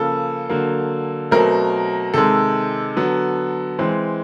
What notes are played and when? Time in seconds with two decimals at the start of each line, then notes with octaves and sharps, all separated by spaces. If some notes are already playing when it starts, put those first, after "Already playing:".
Already playing: C#3 F3 A#3 A4
0.49 D3 F#3 A#3
1.31 B2 F#3 A3 C4 A#4
2.14 C3 D#3 G#3 A4
2.96 D3 F#3 B3
3.79 E3 G#3 C4